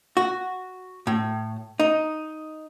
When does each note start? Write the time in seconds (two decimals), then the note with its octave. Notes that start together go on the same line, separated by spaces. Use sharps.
0.17 F#4
1.07 A2
1.80 D#4